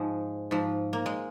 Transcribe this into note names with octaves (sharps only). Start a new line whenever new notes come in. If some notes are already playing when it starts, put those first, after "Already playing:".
Already playing: G#2 F3 G#3
G#2 F3
A#3
G#3